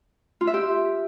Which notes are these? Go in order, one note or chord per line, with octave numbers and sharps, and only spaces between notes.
F4
E5
G4